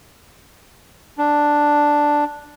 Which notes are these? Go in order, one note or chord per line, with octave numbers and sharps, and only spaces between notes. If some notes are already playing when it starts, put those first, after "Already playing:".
D4